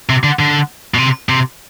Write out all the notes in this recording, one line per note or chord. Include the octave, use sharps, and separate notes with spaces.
C3
D3
D3
B2
C3
C3